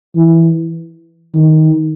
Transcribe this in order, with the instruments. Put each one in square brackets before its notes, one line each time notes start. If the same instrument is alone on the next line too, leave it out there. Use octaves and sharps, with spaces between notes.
[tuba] E3
D#3